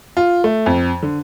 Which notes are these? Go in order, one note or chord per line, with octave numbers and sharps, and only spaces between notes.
F4
A3
F2
D3